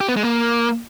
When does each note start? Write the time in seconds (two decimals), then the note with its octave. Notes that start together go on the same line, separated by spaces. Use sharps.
0.01 G4
0.08 B3
0.16 G#3
0.24 A#3